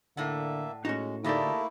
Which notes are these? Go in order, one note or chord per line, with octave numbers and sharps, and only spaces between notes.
A2 D3 A#3 D5 E5 F#5
A2 G#3 C#4 D#4 F#4
D2 A3 A#3 D#4 E4 G4 A4 D5